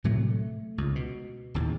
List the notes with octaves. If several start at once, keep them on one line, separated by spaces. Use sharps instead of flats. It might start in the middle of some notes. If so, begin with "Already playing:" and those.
A2 C3 F#3 A3
A3
C#2
B2
D1 D#2